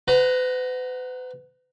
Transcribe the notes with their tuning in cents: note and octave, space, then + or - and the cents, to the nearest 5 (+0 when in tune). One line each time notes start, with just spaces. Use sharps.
B4 +40 F#5 +0 A#5 +0